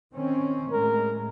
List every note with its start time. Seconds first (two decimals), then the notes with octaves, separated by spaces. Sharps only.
0.14 D#3 C4 C#4
0.72 A2 G#3 A#4